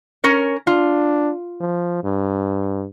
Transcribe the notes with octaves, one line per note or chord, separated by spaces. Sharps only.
C#4 A#4 C#5
D4 F4
F3
G2